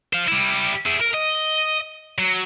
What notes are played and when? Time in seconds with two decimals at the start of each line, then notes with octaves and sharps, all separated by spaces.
0.13 C5 F5
0.28 G3 E4
0.86 E4 G#4
1.01 A#4
1.14 D#5
2.18 F#3